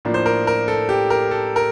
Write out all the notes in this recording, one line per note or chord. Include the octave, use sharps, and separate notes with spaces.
A2 F3 A#3 D4
C5
A#4
A#4
A4
G4
A#4
A4
A#4